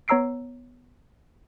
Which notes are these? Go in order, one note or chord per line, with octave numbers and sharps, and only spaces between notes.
B3 C#5 A#5 E6 C7 D7